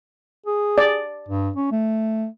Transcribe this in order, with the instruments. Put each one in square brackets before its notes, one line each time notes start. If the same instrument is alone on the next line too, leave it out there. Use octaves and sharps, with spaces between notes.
[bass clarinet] G#4
[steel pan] D5
[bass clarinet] G2
C#4
A3